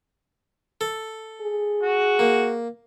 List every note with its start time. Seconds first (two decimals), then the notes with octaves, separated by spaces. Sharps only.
0.81 A4
1.42 G#4
1.83 F#4
2.19 A#3